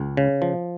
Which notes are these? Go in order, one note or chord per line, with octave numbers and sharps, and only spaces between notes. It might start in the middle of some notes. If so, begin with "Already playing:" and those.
Already playing: C#2
C#3
F3